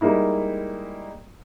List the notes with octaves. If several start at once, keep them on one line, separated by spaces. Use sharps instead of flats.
G3 G#3 A#3 D#4 E4